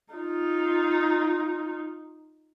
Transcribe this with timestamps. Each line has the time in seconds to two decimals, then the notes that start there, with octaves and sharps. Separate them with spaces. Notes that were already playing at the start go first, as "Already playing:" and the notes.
0.14 D#4 F4